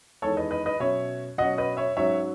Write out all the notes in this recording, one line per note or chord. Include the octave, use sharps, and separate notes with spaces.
E2 D#3 G#3 A4 C#5
B4 D#5
B4 D#5
B4 D#5
B2 F#3 C#4 C#5 E5
B2 F#3 C#4 D#5 F#5
B4 D#5
C#5 E5
G#2 F#3 C#4 C#5 E5